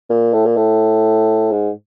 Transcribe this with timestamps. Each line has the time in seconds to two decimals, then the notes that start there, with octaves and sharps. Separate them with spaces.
0.10 A#2
0.33 A2
0.45 A#2
0.57 A2
1.51 G#2